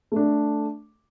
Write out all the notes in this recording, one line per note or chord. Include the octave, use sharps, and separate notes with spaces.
A3 D4 A4